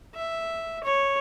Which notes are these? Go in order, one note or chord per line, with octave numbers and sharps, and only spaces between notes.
E5
C#5